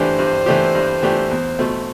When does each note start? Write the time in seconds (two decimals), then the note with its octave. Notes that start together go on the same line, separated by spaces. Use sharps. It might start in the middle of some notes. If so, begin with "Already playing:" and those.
Already playing: G2 E3 A3 D4 G4 C5
0.19 G2
0.46 E3 A3 D4 G4
0.75 G2
1.03 E3 A3 D4 G4
1.31 E2
1.59 B2 A3 C4